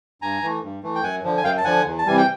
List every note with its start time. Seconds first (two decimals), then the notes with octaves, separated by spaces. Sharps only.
0.22 G2 G#5 A#5
0.43 E3 A3
0.63 G2
0.83 E3 A3
0.95 G5
1.03 F#2 F#5 G#5
1.24 D3 F3
1.37 G#5
1.44 F#2 F5 G5
1.58 A5
1.64 D3 F3 F#5 G#5
1.86 E2
1.99 A5
2.05 C3 E3 G3 G#5
2.17 G5